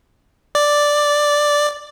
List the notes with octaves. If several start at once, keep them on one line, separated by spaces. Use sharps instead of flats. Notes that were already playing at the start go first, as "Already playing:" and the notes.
D5